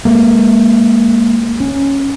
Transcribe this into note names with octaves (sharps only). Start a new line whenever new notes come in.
G#3 A#3
C#4